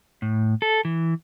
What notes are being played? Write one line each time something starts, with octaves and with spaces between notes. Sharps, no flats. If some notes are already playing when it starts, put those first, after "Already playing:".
A2
A4
E3